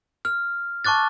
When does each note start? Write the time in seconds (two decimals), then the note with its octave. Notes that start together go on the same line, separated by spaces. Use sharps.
0.25 F6
0.85 A5 C#6 D6 F#6 A6